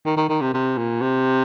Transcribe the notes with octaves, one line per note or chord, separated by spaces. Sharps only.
D#3
D#3
D#3
C3
C3
A#2
C3